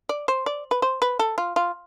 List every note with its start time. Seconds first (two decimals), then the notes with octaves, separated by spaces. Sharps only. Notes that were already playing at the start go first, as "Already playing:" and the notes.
0.09 D5
0.28 C5
0.46 D5
0.71 B4
0.82 C5
1.02 B4
1.19 A4
1.38 F4
1.56 F4